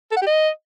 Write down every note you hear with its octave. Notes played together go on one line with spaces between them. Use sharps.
A4
F#5
G4
D#5